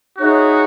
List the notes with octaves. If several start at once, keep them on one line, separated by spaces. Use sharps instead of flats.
D#4 F#4 G#4 C#5 E5